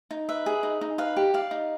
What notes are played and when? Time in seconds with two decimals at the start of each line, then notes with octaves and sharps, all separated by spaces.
0.11 D#4
0.29 B4 E5
0.46 G#4
0.63 D#4
0.81 D#4
0.98 B4 F5
1.17 G4
1.34 D5 F5
1.51 D#4